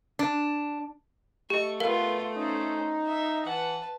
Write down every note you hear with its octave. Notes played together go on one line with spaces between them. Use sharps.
D4
A3 G4 D#5 C#6
F2 B3 F4 A#4 B4 F5 G7
C#4 D#4 C5
E5
E3 B4 F#5 A5